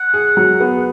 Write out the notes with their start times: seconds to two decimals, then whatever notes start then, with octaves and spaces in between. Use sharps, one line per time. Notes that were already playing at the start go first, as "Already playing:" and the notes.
Already playing: F#5
0.14 G#4
0.37 F#3
0.60 B3